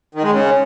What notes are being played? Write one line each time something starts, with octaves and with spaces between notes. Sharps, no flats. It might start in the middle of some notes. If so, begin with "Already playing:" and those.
D#3
G#3
C#3